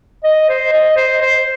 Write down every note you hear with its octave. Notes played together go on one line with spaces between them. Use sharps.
D#5
C5
D#5
C5
C5